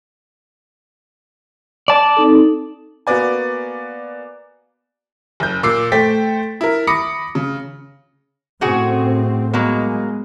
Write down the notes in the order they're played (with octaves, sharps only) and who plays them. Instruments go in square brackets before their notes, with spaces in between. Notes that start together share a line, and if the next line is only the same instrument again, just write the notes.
[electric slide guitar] D5 A5
[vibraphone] C4 D#4 A4
[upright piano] A#3 B3 F#4 B4 D5 G#5
[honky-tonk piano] F#1 G6
A#2 D6 E6 C7
A3 C5 G5 A6 B6
E4 A#4
B5 D6 D#6 A#6 C#7
C#3
[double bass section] A2 C4 [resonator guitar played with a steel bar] C#3 F#4 G#4
[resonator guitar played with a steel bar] F#3 A#3 [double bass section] G#3 [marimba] B3